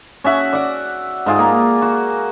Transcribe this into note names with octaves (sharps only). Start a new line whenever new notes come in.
C#4 F#4 E5 F#5
D5 F#5
G#2 F4 G#4
A#3
F#4